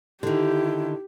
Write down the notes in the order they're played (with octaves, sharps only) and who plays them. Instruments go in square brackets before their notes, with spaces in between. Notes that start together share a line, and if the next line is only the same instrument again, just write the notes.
[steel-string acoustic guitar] D3 D#3 [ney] E4 [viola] G4